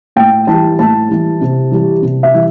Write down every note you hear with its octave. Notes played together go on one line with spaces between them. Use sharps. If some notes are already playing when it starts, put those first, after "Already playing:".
A2 G5
E3 G3 A5
A2 A5
E3 G3
C3
E3 G3
C3
E5
E3 G3